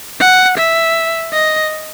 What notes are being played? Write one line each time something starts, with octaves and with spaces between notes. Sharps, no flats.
F#5
E5
D#5